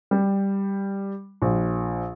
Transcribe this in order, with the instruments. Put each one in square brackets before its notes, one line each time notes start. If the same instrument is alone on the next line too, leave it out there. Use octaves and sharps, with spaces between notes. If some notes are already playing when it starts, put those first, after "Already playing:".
[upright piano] G3
A#1